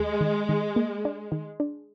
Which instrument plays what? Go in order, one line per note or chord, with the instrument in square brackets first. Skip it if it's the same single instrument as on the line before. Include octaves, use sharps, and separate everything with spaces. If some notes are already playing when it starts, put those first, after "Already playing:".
Already playing: [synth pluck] D#2 [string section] G#3
[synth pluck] D#3
D#3
A#3
D4
D#3
D4